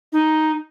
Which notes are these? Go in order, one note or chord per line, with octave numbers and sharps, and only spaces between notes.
D#4